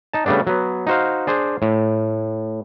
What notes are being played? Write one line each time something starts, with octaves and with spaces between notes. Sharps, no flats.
D#4 A5
C#3 G3 A3 B3 D4
F#3 B3
D#4 F#4 C5 F5
D4 G#4 C5
A2